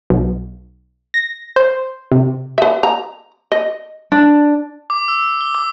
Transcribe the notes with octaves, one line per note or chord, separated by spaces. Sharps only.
B1
A#6
C5
C3
B4 E5
A#5
D#5
D4
D6
E6
G7
D6